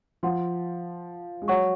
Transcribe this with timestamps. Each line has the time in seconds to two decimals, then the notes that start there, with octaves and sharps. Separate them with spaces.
0.23 F3 C5 F#5 C6
1.42 G#3
1.48 F#3 C#5 F#5 C#6